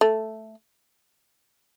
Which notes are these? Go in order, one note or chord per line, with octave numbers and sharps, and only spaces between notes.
A3